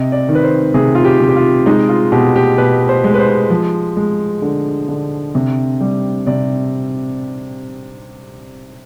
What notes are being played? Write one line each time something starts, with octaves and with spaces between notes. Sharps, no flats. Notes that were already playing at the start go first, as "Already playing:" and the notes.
Already playing: C3 D#5
D5
D#3
B4
C5
C3 G#4
F4
G4
C3
G4
F4
G#3 D#4
F4
B2 G4
G4
B2 B4
C5
G#3
B4
C5
F3
G#3
D3
D3
C3
G3
C3 D5